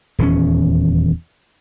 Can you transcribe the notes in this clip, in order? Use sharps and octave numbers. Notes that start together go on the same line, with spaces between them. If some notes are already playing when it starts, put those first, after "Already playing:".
D#1 E2 C#4